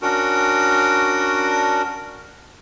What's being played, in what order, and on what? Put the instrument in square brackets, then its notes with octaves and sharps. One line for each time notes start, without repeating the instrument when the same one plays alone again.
[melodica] C#4 D4 F#4 A#4